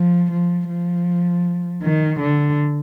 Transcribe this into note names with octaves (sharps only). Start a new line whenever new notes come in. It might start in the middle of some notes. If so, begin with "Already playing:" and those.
Already playing: F3
F3
F3
D#3
D3